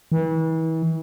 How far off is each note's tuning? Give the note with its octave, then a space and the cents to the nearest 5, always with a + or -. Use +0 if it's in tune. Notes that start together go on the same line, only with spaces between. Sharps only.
E3 -35